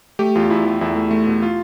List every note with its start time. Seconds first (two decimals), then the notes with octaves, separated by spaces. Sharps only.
0.19 A3 G4
0.35 E2 F4
0.50 E2 E4
0.65 E2
0.81 E2 E4
0.96 A3
1.11 A3
1.27 B2
1.42 F4